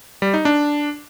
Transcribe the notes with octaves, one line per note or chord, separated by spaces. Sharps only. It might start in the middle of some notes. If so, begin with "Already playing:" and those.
G3
D#4
D4